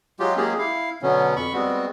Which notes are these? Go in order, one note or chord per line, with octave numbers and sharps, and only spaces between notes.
F#3 G#3 F4 G4
F#3 G#3 A#3 C#4 G4 G#4
E4 F5
B2 D3 F#3 B3 C#4
F2 B5 C#6
G3 G#3 B3 C4 F#4